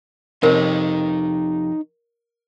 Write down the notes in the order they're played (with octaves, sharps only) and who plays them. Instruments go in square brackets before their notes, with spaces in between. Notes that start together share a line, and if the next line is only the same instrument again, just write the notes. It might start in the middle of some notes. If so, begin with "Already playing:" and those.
[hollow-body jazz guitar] F2 C3 [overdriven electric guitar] D#4 C#5 [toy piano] A#4